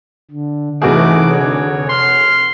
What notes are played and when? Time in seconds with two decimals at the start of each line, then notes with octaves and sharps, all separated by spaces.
0.31 D3
0.82 F1 E3 A3 D#4 F#4 G#4 D6
1.31 D3 C#5
1.89 C6 F6